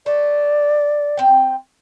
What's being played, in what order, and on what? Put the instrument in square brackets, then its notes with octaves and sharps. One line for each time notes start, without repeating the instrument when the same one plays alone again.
[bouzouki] A3 [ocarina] D5
[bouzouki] C4 G5